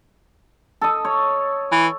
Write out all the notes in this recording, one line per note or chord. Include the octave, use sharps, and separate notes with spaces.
A4 D#5
C#5
E3